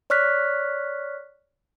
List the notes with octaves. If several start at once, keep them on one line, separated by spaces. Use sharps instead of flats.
C#5 D5 C#6 F6 F#6 B6